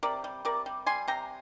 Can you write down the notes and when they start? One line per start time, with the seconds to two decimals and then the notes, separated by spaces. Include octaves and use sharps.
0.03 C3 A#4 D5
0.24 G3
0.45 C3 A#4 D5
0.66 G3
0.86 G3 G#5 C6
1.08 C3 G5 A#5